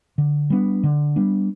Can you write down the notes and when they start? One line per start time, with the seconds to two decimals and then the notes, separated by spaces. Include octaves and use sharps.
0.18 D3
0.50 G3 B3 D4
0.83 D3
1.16 G3 B3 D4